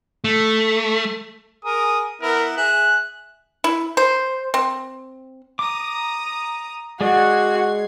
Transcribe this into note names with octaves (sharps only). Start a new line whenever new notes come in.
A3
G#4 A#4 D#6
B3 E4 A#4
G#4 E5 F#6
E4
C5
C4
A#5 D6 D#6
G#3 F#4 G#4 D5 G#6 C7